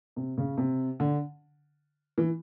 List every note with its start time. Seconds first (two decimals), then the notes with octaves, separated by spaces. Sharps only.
0.16 C3
0.38 C#3
0.58 C3
1.00 D3
2.18 E3